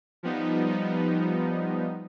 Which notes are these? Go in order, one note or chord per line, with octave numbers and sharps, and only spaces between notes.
F3 G3 B3 D#4